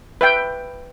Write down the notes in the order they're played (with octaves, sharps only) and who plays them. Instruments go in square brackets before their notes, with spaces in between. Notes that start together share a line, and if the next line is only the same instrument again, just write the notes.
[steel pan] B4 E5 G5